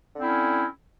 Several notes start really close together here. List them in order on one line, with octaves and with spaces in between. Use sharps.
D3 C4 E4 C#4